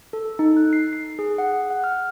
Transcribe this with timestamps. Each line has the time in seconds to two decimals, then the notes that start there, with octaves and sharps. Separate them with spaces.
0.13 A4
0.39 D#4
0.57 F#6
0.73 C7
0.93 C7
1.19 G#4
1.38 F#5
1.70 F#5
1.84 F6